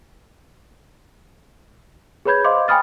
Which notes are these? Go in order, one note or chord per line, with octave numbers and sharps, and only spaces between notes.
G#4 B4 C#5 B5 G6 G#6
C5 D#5 F5 C6 D6
G5 G#5 B5 D#6 F6 A6